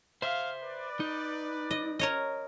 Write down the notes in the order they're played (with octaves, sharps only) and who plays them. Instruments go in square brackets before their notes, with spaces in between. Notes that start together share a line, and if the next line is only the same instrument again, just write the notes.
[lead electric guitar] C5 E5 [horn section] F5
[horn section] B4 D5
[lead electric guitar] D#4
[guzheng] D#5
A#4 C#5 D#5